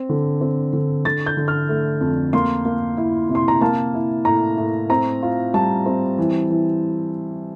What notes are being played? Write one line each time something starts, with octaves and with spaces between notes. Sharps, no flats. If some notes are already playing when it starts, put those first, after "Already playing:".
Already playing: C4
D3
C4
D3
D3 A6
G6
D3
F6
A3
F2
A#3 C6
A#3
E4
C3
C6
A#5
A#3 A5
E4
A2 A#5
A2
C4 A#5
F4
G3 A5
C4
E3
E3